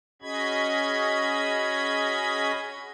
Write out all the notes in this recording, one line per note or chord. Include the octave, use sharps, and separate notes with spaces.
C#4 F#4 G#4 D#5 B5 G#6